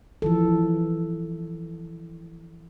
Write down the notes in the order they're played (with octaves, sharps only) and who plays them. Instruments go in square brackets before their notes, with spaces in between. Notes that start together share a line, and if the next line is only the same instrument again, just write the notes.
[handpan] E3 F3 A4